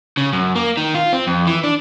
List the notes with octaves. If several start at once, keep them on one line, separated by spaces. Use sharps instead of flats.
C#3
F#2
A#3
D#3
F4
C4
F2
E3
D4